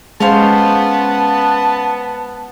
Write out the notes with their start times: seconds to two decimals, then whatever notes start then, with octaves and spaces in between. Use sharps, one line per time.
0.20 G#3 B3 C#4 F4 C5 A5